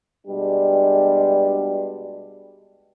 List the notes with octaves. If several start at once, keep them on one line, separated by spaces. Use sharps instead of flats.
B2 G3 G#3 D4